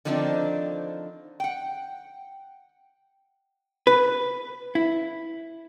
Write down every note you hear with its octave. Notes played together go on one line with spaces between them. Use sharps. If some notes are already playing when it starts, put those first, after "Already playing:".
D3 D#3 F3 C4 D4 D#4
F#5 G5
B4
E4